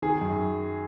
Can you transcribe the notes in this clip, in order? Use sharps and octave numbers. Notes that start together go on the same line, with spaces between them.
D#3 G#4
F#2